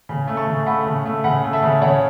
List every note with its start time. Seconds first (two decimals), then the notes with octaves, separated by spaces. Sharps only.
0.09 C#3
0.28 A3
0.37 A5 C#6
0.47 C#3
0.66 A3 F#5 B5
0.86 C#3
1.06 A3
1.24 C#3 F#5 B5
1.44 A3
1.53 E5 A5
1.63 C#3
1.81 C#3 C#5 F#5